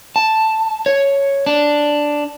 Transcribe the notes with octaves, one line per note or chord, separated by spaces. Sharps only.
A5
C#5
D4